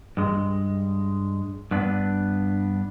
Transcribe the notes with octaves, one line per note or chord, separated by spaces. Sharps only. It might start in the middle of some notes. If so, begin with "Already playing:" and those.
G2 G#3
G2 B3 D4